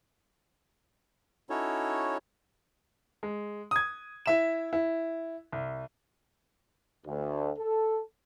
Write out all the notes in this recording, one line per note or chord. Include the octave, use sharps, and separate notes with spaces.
C#4 D#4 E4 F#4 A4 C#5
G#3
D#6 G#6
E4 E5 E7
E4
C2
D2
A4